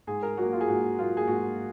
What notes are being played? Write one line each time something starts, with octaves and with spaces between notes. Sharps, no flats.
G#2 G#4
A#4
F#3 A#3 F#4
F4
G#4
G#2 F#4
F#3 A#3 F4
G#4
G#2 F#4